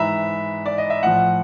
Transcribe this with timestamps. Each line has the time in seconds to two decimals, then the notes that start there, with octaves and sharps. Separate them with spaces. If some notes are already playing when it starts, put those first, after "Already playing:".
Already playing: G#2 E3 E5 A#5 B5
0.66 D5
0.78 D#5
0.90 E5
1.03 A2 F3 F#5